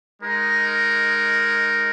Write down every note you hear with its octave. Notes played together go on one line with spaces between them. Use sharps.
G#3 D#4 A#4